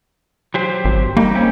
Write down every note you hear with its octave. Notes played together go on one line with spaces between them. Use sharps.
F#3 G4 C5
G#1
G3 A#3 D#4
C4 C#4 G4